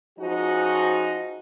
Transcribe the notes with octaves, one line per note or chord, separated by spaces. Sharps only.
F3 G#3 C#4 D#4 F#4